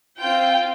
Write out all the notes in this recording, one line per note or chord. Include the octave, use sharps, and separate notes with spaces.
C4 F4 G5